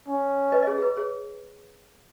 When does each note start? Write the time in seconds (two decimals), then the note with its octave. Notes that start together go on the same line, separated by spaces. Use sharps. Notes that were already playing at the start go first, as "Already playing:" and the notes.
0.08 C#4
0.52 B4 D#5
0.62 D#5
0.67 G#4 C#5
0.78 G#4
0.82 B4
0.97 G#4 C#5